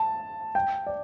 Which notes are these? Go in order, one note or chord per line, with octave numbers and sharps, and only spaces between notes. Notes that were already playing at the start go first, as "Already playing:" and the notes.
Already playing: A5
G5
D5